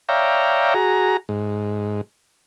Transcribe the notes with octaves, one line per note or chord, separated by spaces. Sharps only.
C#5 D5 E5 F5 G5 A#5
F#4 G#4 A#5
G#2